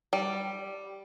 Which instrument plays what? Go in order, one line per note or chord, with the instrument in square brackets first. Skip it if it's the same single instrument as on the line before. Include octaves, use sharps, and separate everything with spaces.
[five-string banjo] G3